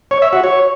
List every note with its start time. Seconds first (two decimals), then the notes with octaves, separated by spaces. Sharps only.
0.11 C#5
0.22 E5
0.33 F#4
0.44 C#5